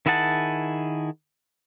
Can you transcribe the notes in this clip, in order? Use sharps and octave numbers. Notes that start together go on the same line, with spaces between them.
D#3 E4 G#4 F#5 A5